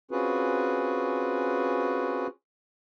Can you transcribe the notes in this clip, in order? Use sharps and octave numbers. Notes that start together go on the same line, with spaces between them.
C4 C#4 F4 F#4 G#4 B4